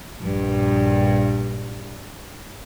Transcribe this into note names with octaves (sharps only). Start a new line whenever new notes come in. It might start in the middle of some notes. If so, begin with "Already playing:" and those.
A#1 G2